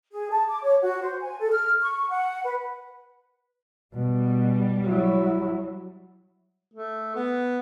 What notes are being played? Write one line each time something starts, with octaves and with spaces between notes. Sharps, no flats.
G#4
A5
D6
C#5
F#4
C5
G#5
A4
F6
C#6
F#5
B4
B2 G3
F#3 E4
A3
B3